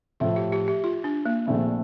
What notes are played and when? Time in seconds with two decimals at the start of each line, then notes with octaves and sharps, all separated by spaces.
0.20 A2 F3 A3 E4 F4
0.36 G4
0.52 G4
0.68 G4
0.84 F4
1.04 D4
1.26 A#3
1.46 A#1 A#2 A3 C4 E4